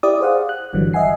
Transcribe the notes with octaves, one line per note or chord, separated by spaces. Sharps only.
E4 G4 D5 D#6
G#4 C5 F5 F#5
F#6
G1 D3 E3 F#3 G3
D#5 E5 F#5 G#5 C7